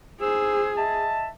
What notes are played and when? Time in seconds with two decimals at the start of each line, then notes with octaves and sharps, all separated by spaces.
0.20 D#4 G#4 C5 E6
0.76 D#5 E5 A5